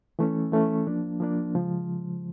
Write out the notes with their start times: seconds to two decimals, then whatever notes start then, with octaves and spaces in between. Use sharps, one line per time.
0.19 E3 A3 C#4
0.52 E3 A3 C#4
0.87 F3 A#3 D4
1.20 F3 A#3 D4
1.55 C#3 F3 G#3